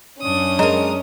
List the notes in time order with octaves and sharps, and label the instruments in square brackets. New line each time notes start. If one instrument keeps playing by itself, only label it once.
[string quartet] F#2 D4 D#6 [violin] C#4
[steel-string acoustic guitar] G#3 A#4 [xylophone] D#5 A#5